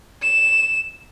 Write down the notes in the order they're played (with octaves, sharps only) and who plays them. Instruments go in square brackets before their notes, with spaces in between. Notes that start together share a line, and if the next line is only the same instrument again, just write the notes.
[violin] E7